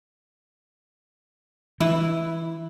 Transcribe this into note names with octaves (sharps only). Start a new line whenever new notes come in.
E3 E4